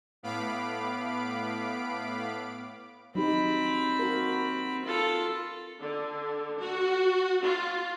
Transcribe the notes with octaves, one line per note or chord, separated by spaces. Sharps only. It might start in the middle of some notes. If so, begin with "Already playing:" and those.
A2 B3 F5 B5 D6 D7
F#3 C4 D#4 G4 B5
F#4 A#4
F4 A4
D3
F#4
F4